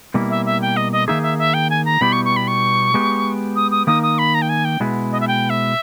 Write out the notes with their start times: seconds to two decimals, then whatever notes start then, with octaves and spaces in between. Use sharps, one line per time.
0.14 B2 G3 A#3 E4
0.30 E5
0.46 E5
0.62 G5
0.77 D#5
0.92 D#5
1.07 D#3 A#3 D#4 G#4 E5
1.23 E5
1.39 E5
1.54 G5
1.70 G#5
1.85 A#5
2.01 B2 G3 B3 E4 G4 B5
2.12 C#6
2.25 C#6
2.36 B5
2.47 C#6
2.94 G#3 B3 G4
3.56 D#6
3.71 D#6
3.87 D#3 A#3 D#4 D#6
4.03 D#6
4.18 B5
4.34 A#5
4.42 G5
4.49 G#5
4.65 G5
4.80 B2 G#3 B3 E4
5.12 D#5
5.20 E5
5.28 G5
5.50 E5